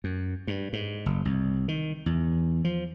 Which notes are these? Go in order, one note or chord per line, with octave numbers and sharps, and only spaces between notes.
F#2
G2
G#2
F#1
C2
D#3
E2
F3